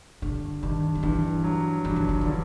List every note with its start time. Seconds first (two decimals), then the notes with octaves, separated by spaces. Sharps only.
0.22 G2 D3
0.62 G2 D#3
0.95 F3
1.03 G2 E3
1.44 F#3
1.84 G2 F3
1.96 E3
2.09 D#3
2.21 D3 E3